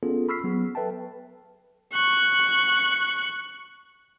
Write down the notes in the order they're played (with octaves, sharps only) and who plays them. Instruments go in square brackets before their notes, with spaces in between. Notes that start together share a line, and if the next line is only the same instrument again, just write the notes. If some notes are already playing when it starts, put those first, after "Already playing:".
[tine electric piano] B3 C#4 F4 G#4 A4
B5 C#6 E6 F6 B6 C7
F#3 B3 G#4
A4 B4 E5 G5 A5
[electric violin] C#6 F#6